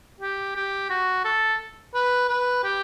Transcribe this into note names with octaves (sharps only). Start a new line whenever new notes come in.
G4
G4
F#4
A4
B4
B4
G4